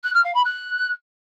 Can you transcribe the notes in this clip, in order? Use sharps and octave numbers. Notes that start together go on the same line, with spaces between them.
F#6
F6
F5
B5
F#6